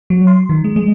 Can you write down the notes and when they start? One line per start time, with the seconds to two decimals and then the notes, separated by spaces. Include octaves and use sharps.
0.10 F#3
0.27 C6
0.49 D#3
0.64 G#3
0.76 G#3